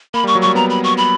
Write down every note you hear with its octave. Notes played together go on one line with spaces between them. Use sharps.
A#3 B5
G3 C#6
F#3
G3 C#6
B3 A#5
B5
C#6
B5